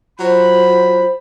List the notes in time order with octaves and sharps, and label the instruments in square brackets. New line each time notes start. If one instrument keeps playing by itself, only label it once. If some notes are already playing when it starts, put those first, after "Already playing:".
[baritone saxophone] F#3 [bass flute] F4 [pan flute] C5 [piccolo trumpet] B5